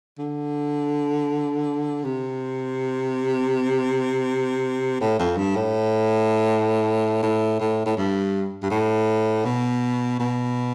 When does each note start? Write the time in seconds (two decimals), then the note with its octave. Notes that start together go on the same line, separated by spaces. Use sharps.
0.19 D3
2.04 C3
5.01 A2
5.19 F2
5.38 G2
5.56 A2
7.22 A2
7.60 A2
7.86 A2
7.97 G2
8.63 G2
8.71 A2
9.45 B2
10.20 B2